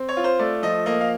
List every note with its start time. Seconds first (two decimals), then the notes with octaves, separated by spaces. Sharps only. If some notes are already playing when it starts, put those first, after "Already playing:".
Already playing: C4
0.09 C#5
0.17 F4
0.24 C5
0.39 A3 D5
0.62 F3 D#5
0.86 A#3 D#5
1.01 F5